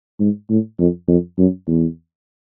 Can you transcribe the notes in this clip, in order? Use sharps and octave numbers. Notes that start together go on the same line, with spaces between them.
G#2
A2
F2
F2
F#2
E2